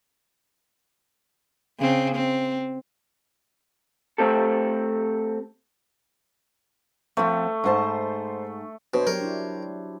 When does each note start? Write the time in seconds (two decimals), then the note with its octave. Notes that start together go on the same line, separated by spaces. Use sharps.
1.80 C#3 C4
2.15 C4
4.18 A3 C4 G4 A4
7.17 F3 A3 C4
7.64 G#2 D#4 C5 A5
8.94 B2 D4 C5 C#5
9.07 F#3 G4 A#4
9.21 D4 E4